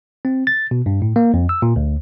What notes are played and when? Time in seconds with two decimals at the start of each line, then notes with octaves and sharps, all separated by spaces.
0.25 C4
0.47 A6
0.71 B2
0.86 G2
1.02 A2
1.16 A#3
1.34 F2
1.49 E6
1.62 A#2
1.76 D2